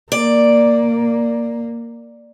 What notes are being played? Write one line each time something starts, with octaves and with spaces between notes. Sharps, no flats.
A#3 D5